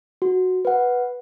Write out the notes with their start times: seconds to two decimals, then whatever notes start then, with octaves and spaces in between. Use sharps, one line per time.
0.22 F#4
0.65 B4 F#5